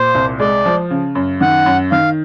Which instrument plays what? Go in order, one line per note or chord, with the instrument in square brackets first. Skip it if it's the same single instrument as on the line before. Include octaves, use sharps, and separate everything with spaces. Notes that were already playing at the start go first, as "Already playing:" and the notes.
Already playing: [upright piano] A#2 [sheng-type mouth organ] C5
[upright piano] C2
[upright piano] G#3 [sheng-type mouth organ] D5
[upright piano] F3
C#3
F#2
[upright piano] D#3 [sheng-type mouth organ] F#5
[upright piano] F#2
[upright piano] D#3 [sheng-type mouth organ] F5